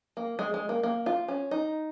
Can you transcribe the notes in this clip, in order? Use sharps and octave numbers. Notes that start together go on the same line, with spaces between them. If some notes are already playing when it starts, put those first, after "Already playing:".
A#3
G#3
G#3
A#3
A#3
F4
C#4
D#4